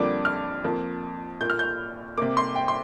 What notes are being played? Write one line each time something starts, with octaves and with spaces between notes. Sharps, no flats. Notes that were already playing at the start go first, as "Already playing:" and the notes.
Already playing: F2 D3 G3 A#3 D6
F6
F2 F3 A#3
A#2 A#3 G6
F6
G6
C3 A#3 D6
C6
G5
C6